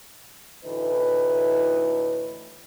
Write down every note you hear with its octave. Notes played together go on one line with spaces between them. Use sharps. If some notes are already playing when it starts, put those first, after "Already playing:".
D2 A2 E3 D#4 B4